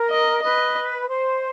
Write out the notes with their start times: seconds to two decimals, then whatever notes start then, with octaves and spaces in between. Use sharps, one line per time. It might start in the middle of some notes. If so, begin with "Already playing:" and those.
Already playing: A#4
0.10 D#5
0.42 B4 D#5
1.08 C5